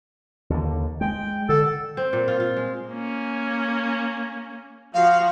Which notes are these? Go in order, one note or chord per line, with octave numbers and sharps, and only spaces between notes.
D#2 D3
G#3 G5
D3 A4
C4
A#2
F4
F4
G#3
A#3 C#4
F3 F#4 F5